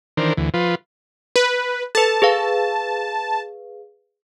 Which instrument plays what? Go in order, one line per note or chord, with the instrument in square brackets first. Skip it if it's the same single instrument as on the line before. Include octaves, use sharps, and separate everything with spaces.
[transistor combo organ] D#3 E3 D4 A#4 C5
D2 E3
F3 F4 B4
[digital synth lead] B4
[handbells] A4 B4 [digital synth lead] A5
[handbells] G#4 B4 F5